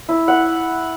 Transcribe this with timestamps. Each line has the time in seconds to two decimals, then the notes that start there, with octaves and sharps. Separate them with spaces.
0.09 E4
0.28 F#5